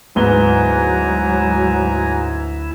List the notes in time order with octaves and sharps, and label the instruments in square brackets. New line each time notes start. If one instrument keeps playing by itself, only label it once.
[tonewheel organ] D2 E4 [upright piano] G#2 B3 G7 [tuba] F#3 [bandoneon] G#5 A#5